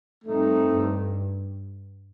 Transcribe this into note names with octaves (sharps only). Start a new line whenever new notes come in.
G2 A3 C4 D#4
G2